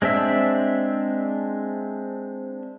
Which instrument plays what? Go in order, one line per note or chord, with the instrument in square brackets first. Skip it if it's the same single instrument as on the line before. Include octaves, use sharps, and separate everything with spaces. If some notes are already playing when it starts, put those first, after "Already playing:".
[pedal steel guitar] G#3 C4 D4 E5 E6